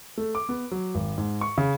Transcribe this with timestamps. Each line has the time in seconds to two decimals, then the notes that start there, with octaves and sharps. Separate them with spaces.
0.17 A3
0.35 D6
0.49 B3
0.71 F#3
0.95 G#1
1.18 G#2
1.41 C#6
1.58 C#3